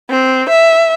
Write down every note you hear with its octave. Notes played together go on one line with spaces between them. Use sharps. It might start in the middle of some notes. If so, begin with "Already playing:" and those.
C4
E5